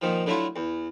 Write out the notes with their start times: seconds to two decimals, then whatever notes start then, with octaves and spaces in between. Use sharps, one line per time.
0.01 A#2 D#3 F3
0.26 D3 F#3 A3 E4 F4
0.56 E2